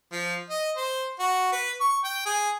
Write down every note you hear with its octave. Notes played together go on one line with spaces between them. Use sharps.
F3
D#5
C5
F#4
B4
C#6
G5
G#4